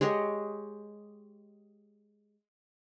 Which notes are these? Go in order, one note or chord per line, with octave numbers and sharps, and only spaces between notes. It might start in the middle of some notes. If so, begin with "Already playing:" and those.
G#3 G4 C#5 D#5